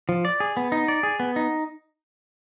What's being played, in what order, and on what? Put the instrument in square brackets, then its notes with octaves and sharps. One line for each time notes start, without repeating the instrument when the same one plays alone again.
[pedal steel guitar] F3
D5
G#4
B3
D#4
D5
G#4
B3
D#4